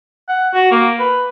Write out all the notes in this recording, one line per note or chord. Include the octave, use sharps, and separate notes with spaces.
F#5
F#4
A#3
B4